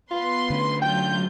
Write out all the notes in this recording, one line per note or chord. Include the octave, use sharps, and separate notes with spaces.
B3 F4 B4 C6
D3 A3 C#4
F#3 F4 G5 G6